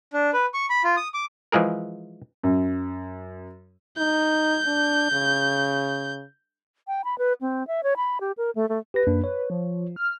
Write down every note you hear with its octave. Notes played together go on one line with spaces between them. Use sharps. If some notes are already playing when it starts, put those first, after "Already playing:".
D4
B4
C#6
B5
F4
D#6
D6
E3 F3 G#3 G#4 A#4
F#2
D#4 G6
D4
C#3
G5
B5
B4
C4
E5
C#5
B5
G4
A#4
A3
A3
G4 B4 A#6
F#2 A#3 D4
B4 C#5
F3
F6